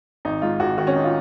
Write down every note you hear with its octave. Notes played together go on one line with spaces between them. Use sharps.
G#1 D#4
G#2 F4
G#1 F#4
D#3 F#4
C#4
D#4
F4